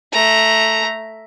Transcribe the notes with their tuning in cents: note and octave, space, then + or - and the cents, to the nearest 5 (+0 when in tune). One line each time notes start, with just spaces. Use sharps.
A3 +0 A#5 +0